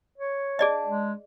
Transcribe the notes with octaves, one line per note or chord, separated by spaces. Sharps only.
C#5
D4 G#4 D5 D#5
G#3